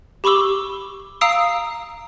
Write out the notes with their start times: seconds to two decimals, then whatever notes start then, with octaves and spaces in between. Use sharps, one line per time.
0.24 G4 B5 C#6 D6 E6 G7
1.21 F5 A#5 D#6 E6 C7 D7